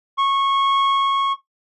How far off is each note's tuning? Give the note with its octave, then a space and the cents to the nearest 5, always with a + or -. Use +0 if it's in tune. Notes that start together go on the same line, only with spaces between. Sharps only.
C#6 -15